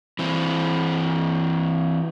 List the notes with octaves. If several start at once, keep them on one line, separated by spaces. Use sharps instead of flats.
E3 C4